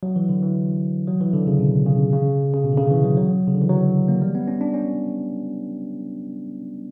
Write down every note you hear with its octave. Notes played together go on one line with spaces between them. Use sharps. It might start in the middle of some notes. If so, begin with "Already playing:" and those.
F#3
E3
D3
E3
F#3
E3
D3
C#3
B2
C#3
C#3
C#3
B2
D3
C#3
E3
F#3
F#3
C#3
D3
E3
F#3
A#3
G3
B3
C#4
D4
C#4